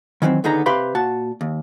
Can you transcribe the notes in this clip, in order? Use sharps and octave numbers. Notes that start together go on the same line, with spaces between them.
D#3 E3 F#3 A3 C4
D#2 D3 B3 D#4 G#4 A#5
C3 G4 B4 F5 B5 C6
A#2 F#4 A5
D#2